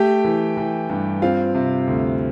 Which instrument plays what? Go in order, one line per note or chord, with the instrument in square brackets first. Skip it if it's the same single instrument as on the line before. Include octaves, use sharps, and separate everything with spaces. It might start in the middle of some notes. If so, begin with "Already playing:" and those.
Already playing: [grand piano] A3 G4 G5
E3
E3
G2
C4 F4 F5
C3
D2